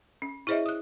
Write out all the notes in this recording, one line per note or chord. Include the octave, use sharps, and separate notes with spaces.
C#4
E4 G#4 C5 C#5 D#5 E5
D#6 F#6